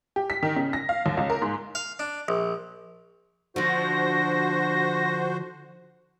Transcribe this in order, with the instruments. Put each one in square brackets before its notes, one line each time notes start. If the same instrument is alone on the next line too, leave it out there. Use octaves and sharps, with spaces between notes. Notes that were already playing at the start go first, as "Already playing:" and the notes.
[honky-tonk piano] G4
B6
D#3
C#3
A#6
F5
D#2
C#2
A#4
G#2
[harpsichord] F5
D4
A#1
[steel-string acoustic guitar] D3 F3 [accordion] F#4 C5 [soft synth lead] A#6